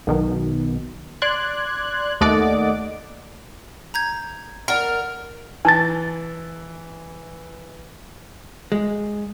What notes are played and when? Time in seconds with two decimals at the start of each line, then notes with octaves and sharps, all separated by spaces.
0.07 B1 B2 D#3
1.22 D5 C6 F#6 G#6
2.21 D#2 A3 D5 D#5 F#5 D6
3.94 A#5 G6 G#6
4.68 A#4 D5 F#5
5.65 E3 G#5 A5 A6
8.72 G#3